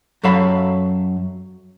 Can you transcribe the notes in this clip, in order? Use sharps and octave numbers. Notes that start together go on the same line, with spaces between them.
F#2 F#3 A4 F5 B5